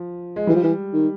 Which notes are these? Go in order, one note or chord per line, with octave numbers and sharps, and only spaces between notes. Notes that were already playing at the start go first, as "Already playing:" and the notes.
Already playing: F3
G#3
E3 G3
F3
E3
D#3